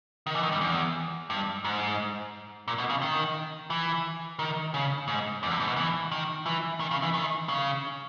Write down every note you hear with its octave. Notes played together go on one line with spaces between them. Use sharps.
D#3
E3
D#3
G2
E2
G2
G#2
A#2
B2
C#3
D#3
E3
D#3
C#3
G#2
E2
G2
G#2
B2
E3
D#3
E3
D#3
C#3
E3
D#3
C#3